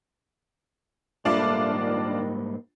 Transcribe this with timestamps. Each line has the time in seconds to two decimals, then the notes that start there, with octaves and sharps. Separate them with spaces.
1.25 G#2 G3 A3 A#3 D4 F4 D5
1.73 D#3